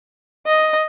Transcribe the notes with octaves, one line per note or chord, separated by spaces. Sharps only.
D#5